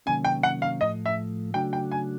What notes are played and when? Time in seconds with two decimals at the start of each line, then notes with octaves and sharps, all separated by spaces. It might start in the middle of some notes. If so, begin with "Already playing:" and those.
0.06 C3 D#3 F#3 A#3 C#4 G#5
0.25 G5
0.43 F#5
0.62 F5
0.80 A2 F3 A3 D#5
1.06 E5
1.54 C#3 F#3 A3 D4 F#4 G5
1.73 G5
1.92 G#5